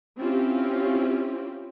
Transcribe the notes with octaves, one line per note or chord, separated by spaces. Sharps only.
C4 C#4 E4 F4 G4